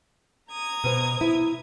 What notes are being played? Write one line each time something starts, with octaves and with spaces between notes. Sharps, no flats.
A#5 D#6 G#6
B2 C5
E4